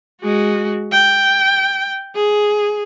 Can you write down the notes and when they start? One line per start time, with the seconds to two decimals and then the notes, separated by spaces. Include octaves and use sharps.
0.22 G#3 F#4
0.92 G5
2.15 G#4